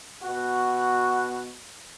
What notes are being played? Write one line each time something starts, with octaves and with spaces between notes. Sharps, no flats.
B2 F#4